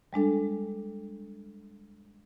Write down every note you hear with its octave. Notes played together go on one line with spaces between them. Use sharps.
G3 G#3 D4 A4